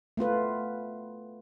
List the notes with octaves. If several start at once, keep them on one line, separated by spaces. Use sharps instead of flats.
A3 B3 F4 B4